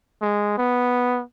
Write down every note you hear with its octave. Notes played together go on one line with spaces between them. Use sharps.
G#3
B3